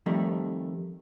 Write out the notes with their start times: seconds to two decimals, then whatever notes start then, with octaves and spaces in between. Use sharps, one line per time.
0.06 F2 D#3 G3 A3